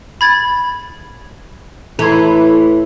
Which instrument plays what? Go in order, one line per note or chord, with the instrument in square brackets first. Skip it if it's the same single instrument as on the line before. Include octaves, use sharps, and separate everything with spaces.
[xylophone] B5 G#6 A6
[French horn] A2 [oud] E3 [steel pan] A4 C6 [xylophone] A#5 G#6